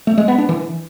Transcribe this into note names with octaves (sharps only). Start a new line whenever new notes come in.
A3
G#3
B3
D4
E3